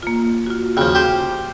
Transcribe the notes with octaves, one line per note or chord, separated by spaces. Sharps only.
A#3 F4
F4 F#4
D#2 C#3 F3 F#4
G4 C5